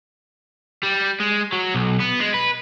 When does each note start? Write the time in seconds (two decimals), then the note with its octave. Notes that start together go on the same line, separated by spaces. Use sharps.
0.83 G3
1.20 G#3
1.52 F#3
1.75 B1
2.00 B3
2.20 G#3
2.34 B4